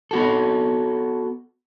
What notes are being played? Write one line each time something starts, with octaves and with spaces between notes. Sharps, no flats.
B3 F#4 A4